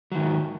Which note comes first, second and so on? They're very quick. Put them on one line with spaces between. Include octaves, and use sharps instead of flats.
F#3 D#3 G#2